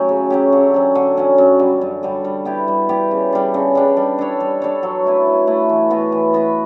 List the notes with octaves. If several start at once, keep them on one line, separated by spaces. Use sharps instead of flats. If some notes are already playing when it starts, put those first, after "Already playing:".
Already playing: F#3 A3 C#4 G4
C#3
F#3 C#4 G4
D3
F#3 C#4
D3
F#3 C#4
F#2
D3 G3
F#2
D3 G3
G3
B3 E4 G4
G3
B3 E4 G4
C#3
G3 D4
C#3
G3 D4
G3
D4 A4 C#5
G3
D4 A4 C#5
F#3
A3 E4 B4
F#3
A3 E4 B4
E3
B3 F#4 B4
E3
B3 F#4 B4